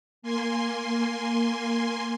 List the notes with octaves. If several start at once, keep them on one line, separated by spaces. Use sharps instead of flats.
A#3 G#5 C6